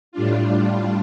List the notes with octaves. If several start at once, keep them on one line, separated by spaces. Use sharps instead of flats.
A2 G3 D4 F4